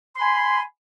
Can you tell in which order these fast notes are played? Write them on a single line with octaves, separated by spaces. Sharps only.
C6 B5 G#5